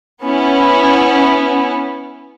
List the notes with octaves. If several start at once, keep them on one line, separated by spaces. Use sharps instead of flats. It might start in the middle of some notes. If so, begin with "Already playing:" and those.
B3 C#4 E4